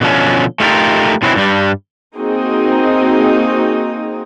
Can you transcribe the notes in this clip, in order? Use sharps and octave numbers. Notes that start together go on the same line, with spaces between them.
B2 D3 F3 C#4
A3 D#4 F4 G4 A4 A#4
B2 E3 F#3 C4 C#4 E4
G2 G3
A#3 C4 D#4 F#4 G#4 D#5